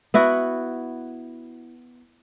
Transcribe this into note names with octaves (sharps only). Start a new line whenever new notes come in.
B3 E4 F#4